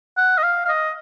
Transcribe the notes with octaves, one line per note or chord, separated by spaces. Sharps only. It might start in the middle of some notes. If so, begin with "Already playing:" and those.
F#5
D#5
F5
F5
D#5